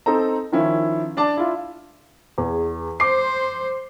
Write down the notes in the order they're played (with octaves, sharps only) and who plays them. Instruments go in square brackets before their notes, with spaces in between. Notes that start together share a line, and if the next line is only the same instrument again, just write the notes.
[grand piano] C4 D#4 A4 C5 A#5
D#3 F3 C#4 E4
D4 D5 A5
E4 F4
[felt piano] E2 G#4
[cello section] C5 [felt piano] D6 C7